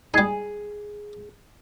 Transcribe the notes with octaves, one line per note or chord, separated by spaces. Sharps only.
G3 D#4 G#4